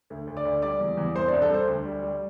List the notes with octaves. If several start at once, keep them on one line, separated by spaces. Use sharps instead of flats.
D2
D2
D5 D6
D2
G3 D5 D6
E2
E2
C2 C5 C6
D4 D5
C2
A4
C2 C5
D2
G3
G3